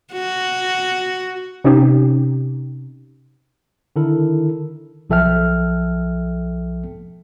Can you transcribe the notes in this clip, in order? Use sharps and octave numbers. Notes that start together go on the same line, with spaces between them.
F#4
C3 C#4 D#4 G4
D3 D#3 E4 A4 A#4
B1 F3 A4 E5 G5 F6